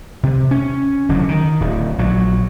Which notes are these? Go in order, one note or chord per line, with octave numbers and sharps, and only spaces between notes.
C3
C#4
E1 D3 F#3
D#3
D1
A#1 F#3